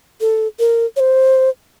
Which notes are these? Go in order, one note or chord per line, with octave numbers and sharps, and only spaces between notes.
A4
A#4
C#5
C5